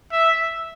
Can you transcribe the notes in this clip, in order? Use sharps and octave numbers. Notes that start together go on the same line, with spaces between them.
E5